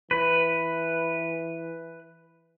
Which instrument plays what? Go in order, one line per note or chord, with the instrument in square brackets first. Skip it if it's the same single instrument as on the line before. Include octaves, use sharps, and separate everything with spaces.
[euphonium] E3 [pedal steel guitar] B4